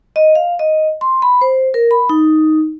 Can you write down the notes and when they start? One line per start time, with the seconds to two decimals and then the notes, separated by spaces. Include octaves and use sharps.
0.16 D#5
0.35 F5
0.59 D#5
1.01 C6
1.22 B5
1.41 C5
1.74 A#4
1.91 B5
2.09 D#4